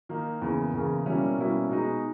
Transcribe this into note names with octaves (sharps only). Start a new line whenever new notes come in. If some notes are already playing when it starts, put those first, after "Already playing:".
D#3 A#3 D#4
E2 C#3 E3 A#3
E2 C#3 E3 A#3
B2 G3 A#3 C#4 E4
B2 G3 A#3 C#4 E4
B2 G#3 D#4